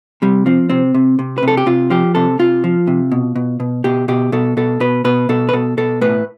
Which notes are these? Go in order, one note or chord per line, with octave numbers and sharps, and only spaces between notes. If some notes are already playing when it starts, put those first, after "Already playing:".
C3 G3
F3 C4
C3 C4
C3
C3
B4
C3 A4
G4
C3 F4
F3 G4
C3 A4
C3 F4
F3
C3
B2
B2
B2
B2 G4
B2 G4
B2 A4
B2 A4
B2 B4
B2 B4
B2 A4
B4
B2 A4
B2 A4
A2 B4